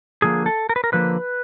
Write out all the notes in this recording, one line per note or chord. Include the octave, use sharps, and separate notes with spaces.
D3 F3 A#3 G#4
A4
A#4
B4
A#4
D3 F3 A#3 B4